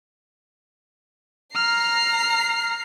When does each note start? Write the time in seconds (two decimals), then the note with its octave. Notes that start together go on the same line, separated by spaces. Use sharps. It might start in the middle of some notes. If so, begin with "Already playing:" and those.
1.55 A#5 F6 C7